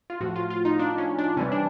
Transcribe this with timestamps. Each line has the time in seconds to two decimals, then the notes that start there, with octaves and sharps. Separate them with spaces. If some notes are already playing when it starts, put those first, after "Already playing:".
0.10 F4
0.20 A2 F3 F#4
0.36 F4
0.50 F4
0.65 D#4
0.79 D4
0.98 C#4
1.18 D4
1.37 C3 E3 G3 C#4
1.52 D4